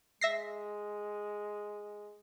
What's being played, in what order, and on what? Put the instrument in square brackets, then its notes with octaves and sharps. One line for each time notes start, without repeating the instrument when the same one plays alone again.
[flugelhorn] G#3 [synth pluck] E5 A#6 C7